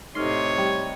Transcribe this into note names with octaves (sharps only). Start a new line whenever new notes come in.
A2 C3 D#4 A4 C#5 D#5 C6 F6
G3